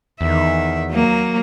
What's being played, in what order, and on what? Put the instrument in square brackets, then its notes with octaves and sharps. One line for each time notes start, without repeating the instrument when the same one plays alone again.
[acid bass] E2 [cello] D#3 E5
[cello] F#3 A#3